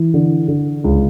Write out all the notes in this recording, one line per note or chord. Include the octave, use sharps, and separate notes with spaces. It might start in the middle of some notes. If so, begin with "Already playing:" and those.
Already playing: E3
D3
D3
C#2